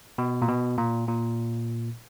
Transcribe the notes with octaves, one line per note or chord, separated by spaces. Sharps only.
B2
A#2
B2
A#2
A#2